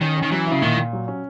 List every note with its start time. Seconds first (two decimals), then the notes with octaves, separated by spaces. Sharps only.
0.01 D#3 C#4
0.17 C#4
0.23 D#3
0.32 E3 F#3
0.47 C#3 E4
0.62 A#2 D#3
0.77 A#2
0.93 F#3
1.08 C#4